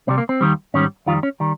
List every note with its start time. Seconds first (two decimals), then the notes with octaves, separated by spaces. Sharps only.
0.07 C2 C3 G3 C4
0.18 A#3
0.29 C4
0.41 D#2 D#3 G3
0.74 G#2 D#3 G3 C#4
1.06 F2 D#3 G3 F4
1.23 C#4
1.40 D#3 G3